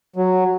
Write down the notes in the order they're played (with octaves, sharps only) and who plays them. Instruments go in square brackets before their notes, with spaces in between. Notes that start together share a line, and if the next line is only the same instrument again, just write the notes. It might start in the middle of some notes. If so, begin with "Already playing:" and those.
[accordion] F#3